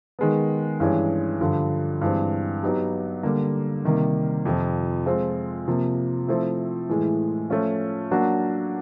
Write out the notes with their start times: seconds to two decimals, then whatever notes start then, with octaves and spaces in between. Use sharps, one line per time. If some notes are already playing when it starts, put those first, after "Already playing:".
0.19 D#3 G#3 B3
0.80 G2 E3 G#3 C#4
1.41 G2 D3 F3
2.01 G2 E3 G#3 C4
2.63 F#3 B3 D#4 G4
3.23 D3 G3 A#3
3.85 C3 D#3 G3 A#3
4.45 F2 C3 F3
5.06 F3 G#3 C4 F4
5.67 C3 F3 A#3
6.28 F3 A3 C4 E4
6.89 A2 E3 G#3
7.50 F3 A3 C#4 F4
8.11 F#3 A#3 D4 F#4